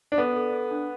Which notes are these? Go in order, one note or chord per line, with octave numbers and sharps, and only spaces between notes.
D4
B3 A4
A4
A4
D4